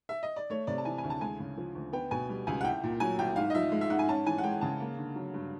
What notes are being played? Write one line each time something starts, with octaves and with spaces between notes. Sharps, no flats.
E5
D#5
D5
A3 C#5
C3 D5
A5
E3 G#5
G#5
D2
A5
G#3 G#5
C#3
F3
D2
B3 G5
B2 G#5
G3
C#2 G#5
F#5
C2 G5
A#2
F#3 G#5
C2 G5
G#2 F5
D#5
F3 E5
G#3
E5
G#2 F#5
G#5
C#4 A5
E3 G#5
F#5
G#3 G5
C#3 A5
A#3
D3
F#3
G2